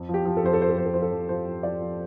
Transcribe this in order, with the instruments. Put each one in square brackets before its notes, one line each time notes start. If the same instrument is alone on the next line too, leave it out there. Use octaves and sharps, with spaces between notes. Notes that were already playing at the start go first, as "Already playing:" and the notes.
Already playing: [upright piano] F2
F3
G4
F3
A4
F2 C5
A4
F3 C5
A4
F2 C5
A4
F3 C5
A4
F2
F3 C5
F3
F3 D5
F3